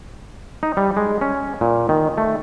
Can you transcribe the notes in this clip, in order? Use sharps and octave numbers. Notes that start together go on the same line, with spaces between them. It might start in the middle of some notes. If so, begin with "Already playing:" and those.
D#4
G3
G#3
C#4
A#2
D#3
A3